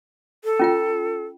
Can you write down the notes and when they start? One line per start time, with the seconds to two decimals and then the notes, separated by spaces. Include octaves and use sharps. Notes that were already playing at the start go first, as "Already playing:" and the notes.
0.44 A4
0.59 C#4 F4 G5